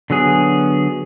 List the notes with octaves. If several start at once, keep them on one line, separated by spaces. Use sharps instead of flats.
D3 F#3 B3 G#4